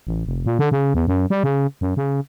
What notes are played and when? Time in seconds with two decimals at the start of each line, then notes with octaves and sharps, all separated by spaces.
0.07 A1
0.26 F1
0.46 A#2
0.59 D3
0.72 C#3
0.94 E2
1.08 F#2
1.30 G3
1.44 C#3
1.81 F#2
1.97 C#3